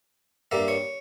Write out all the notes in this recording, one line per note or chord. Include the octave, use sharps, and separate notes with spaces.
G2 G3 A#3 E5
C#5